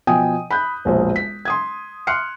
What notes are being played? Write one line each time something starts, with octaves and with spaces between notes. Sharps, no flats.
B2 F3 G5 G#5 D#6
B5 F#6 G6
E1 A#1 C5
B6
C6 D#6 G#6
C6 F6 F#6 C7 C#7